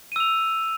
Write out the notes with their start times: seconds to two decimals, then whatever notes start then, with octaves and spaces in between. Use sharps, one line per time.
0.12 D#7
0.16 E6
0.20 F7